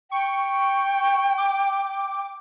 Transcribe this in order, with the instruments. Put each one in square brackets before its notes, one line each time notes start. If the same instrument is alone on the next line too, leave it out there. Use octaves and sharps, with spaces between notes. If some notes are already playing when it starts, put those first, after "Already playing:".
[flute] G5 [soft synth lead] C#6
[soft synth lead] D6